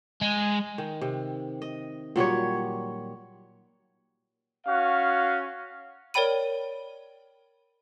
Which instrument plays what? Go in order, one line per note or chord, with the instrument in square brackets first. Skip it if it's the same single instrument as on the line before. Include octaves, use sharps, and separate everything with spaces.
[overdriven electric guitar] G#3
[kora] D#3
C3
D#5
A#2 F#3 G3 C#5
[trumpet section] C#4 F#4 F5
[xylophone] A#4 C#5 D5 G5 B5 D#7